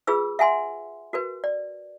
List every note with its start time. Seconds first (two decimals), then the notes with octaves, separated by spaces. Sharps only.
0.07 F4 G#4 B4 E6
0.39 E5 F#5 G#5 C6
1.13 F#4 A#4 B4
1.44 D5